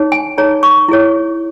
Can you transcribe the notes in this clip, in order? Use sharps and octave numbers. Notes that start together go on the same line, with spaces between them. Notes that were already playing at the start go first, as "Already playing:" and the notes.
Already playing: D#4 G#4 C#5
G#5
D#4 G#4 C#5 A#5
C#6
E4 G#4 C#5